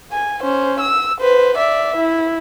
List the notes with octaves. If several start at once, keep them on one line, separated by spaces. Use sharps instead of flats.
G#5
C#4 C5
E6
B4 C5
D5 E5
E4